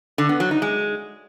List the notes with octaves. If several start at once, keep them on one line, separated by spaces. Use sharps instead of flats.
D3
B3
F#3
D#4
G#3